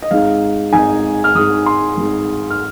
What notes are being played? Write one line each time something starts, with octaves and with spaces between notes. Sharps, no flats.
D#5
G#1 G#2 G#3 D#4 F5
G#1 G#2 G#3 D#4 G#5
F6
G#1 G#2 G#3 D#4 D#6
C6
G#1 G#2 G#3 D#4
F6